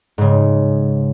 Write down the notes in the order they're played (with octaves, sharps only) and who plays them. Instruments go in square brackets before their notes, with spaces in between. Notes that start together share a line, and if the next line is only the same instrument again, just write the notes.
[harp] G#2 C#3